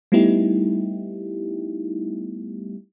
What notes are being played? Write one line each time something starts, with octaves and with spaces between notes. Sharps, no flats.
G3 A3 B3 D#4 E4 G4